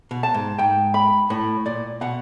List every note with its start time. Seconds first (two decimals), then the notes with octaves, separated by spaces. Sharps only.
0.11 B2
0.23 A5
0.34 G#2
0.58 G#2 G5
0.94 B5
1.30 A2 B5
1.66 A#2 D5
2.01 B2 F#5